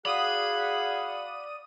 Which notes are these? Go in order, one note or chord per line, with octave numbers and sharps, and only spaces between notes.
F#4 G#4 D5 F5 F#5 B5 D#6 D#7